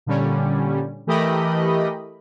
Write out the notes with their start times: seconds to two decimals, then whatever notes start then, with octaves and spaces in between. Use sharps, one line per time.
0.06 A#2 D3 G3 C#4
1.07 E3 A3 G4 A#4 D#5 B5